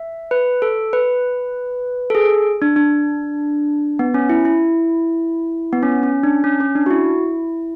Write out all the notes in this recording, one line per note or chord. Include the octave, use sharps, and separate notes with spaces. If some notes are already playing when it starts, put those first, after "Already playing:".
Already playing: E5
B4
A4
B4
A4
G#4
D4
D4
B3
C#4
E4
E4
B3
C#4
C#4
D4
C#4
C#4
D4
F#4
E4